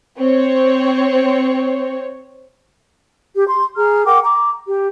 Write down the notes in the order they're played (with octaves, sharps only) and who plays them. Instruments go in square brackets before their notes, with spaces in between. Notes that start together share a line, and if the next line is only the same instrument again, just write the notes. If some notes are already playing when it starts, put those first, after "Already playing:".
[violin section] C4 C#5
[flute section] G4
C6
G#4 A#5 F6
A#4 F#5 G5 D6
A#5 D6
G4